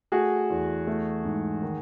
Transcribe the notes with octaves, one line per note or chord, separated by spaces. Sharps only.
A3 F#4 G#4
E2
A3
G#2
D#3